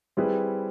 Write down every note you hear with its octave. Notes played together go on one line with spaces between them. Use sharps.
G3 C4 E4 G#4 B4